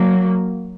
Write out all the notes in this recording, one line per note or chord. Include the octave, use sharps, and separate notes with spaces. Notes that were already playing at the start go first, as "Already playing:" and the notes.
Already playing: F#3 A#3